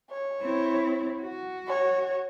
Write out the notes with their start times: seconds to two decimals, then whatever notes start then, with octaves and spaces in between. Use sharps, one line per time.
0.10 C#5
0.41 C4 E4
1.21 F#4
1.68 C#5